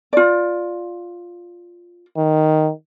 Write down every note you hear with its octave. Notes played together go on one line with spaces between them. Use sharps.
F4 D5
D#3